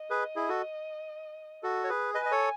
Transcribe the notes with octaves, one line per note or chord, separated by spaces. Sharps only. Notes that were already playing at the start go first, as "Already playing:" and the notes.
Already playing: D#5
G#4 B4
E4 G#4
F#4 A4
F#4 A4
C#5
G#4 B4
B4 D#5 G#5
D#5
A4 C#5